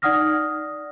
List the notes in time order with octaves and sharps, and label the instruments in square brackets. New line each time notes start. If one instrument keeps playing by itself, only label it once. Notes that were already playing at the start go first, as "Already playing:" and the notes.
[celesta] D#4 D5 F#5 D#6 F6 A#6